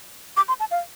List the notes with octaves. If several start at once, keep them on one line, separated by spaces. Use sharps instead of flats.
D6
C6
A5
F5